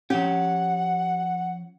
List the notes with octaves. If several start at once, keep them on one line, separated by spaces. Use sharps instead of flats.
F3 C#4 G4 C#5 F#5